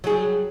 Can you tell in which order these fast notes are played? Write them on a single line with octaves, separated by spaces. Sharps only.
F#3 G#4 G3